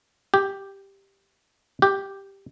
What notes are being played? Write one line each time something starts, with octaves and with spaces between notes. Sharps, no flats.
G4
G4